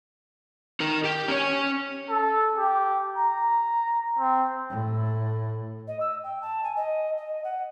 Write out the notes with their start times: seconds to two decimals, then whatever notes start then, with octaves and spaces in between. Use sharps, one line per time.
0.80 D#4 A#4
1.04 G4 G5
1.28 C#4 C#5
2.10 A4
2.57 G4
3.17 A#5
4.19 C4
4.70 A2
5.87 D#5
6.00 E6
6.24 G5
6.42 A5
6.63 G#5
6.76 D#5
7.18 D#5
7.44 F#5